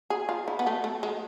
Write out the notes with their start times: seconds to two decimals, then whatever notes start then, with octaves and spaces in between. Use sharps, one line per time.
0.10 G#4
0.29 F4
0.48 E4
0.59 B3
0.67 A3
0.84 A3
1.03 G#3